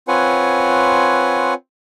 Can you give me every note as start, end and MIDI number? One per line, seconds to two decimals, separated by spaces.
0.08 1.54 60
0.08 1.54 65
0.08 1.54 71
0.08 1.54 73
0.08 1.54 78
0.08 1.54 80